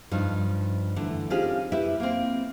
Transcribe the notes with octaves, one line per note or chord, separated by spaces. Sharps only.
G2 F3 D#4
D3 E3 A3
C4 C#4 D#4 F4 G4 G#4
E4 G4 B4 E5
A#3 C4